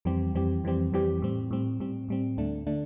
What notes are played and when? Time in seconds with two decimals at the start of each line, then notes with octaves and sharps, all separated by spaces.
0.05 F2 E3 G3 C4 G4
0.34 F2 E3 G3 C4 G4
0.64 F2 E3 G3 C4 G4
0.93 F2 E3 G3 C4 G4
1.22 A2 G3 C4
1.51 A2 G3 C4
1.80 A2 G3 C4
2.08 A2 G3 C4
2.37 D2 D3 A3 D4
2.67 D3 A3 D4